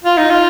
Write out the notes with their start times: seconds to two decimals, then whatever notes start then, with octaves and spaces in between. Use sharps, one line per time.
0.04 F4
0.18 D#4
0.30 F4